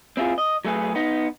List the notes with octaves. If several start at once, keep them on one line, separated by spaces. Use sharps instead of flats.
C4 E4 F4 G#4
D#5
F#3 A3 G#4 B4
B3 D#4